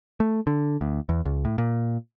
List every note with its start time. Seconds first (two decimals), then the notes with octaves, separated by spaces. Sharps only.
0.20 A3
0.47 D3
0.81 D2
1.09 E2
1.25 C#2
1.45 A2
1.58 A#2